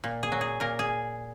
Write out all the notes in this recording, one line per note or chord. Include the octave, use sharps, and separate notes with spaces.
A#2
G#4
F#3
G#4
A#2 A#4
G#4